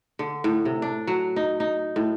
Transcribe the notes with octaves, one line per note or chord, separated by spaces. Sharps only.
D3
A2
C3
D4
F#3
D#4
D#4
A2